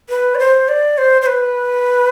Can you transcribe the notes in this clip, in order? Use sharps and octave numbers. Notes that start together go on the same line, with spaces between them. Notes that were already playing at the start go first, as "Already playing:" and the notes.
B4
D5
C5
D5
C5
C5
B4